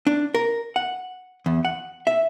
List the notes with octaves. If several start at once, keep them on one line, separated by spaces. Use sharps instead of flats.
D4
A#4
F#5
E2
F#5
E5